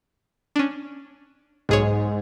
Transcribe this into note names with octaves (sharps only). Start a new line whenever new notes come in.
C#4 D4
B1 G#2 G#4 C#5